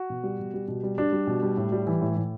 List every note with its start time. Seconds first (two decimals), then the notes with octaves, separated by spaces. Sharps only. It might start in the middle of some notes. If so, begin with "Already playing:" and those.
Already playing: F#4
0.10 B2
0.23 G3
0.39 B2
0.54 G3
0.68 B2
0.83 G3
0.98 G3 D4
1.13 G3
1.27 B2
1.43 G3
1.57 A2
1.72 G3
1.87 E3
2.01 A2
2.16 A2